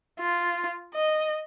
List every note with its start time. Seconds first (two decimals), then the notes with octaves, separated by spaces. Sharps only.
0.19 F4
0.95 D#5